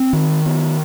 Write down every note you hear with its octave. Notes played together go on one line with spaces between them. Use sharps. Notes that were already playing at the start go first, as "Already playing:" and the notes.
Already playing: C4
D#3
B3